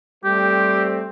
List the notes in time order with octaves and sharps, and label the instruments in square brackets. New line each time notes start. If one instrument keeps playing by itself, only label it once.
[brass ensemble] G3 A3 C4 [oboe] G4